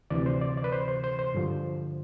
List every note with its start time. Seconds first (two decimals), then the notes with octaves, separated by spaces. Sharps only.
0.10 D2 C3 E3 D5
0.26 C5
0.41 D5
0.57 D5
0.64 B4
0.72 C5
0.88 C5
1.04 C5
1.19 C5
1.34 G2 D3 F3